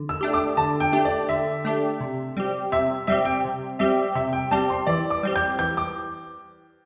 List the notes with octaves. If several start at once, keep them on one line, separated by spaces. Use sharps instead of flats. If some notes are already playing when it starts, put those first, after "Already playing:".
Already playing: D3
E6
A3 D4 G4
D6
D3 A5
G5
A3 D4 G4
D5
D3 E5
A3 D4 G4
C3
G3 C4 G4
C3 E5
G3 C4 G4 E5
G5
C3
G3 C4 G4 E5
C3 E5
G5
G3 C4 G4 A5
C6
E3 D5
D6
G3 C4 G4
G6
E3 G6
D6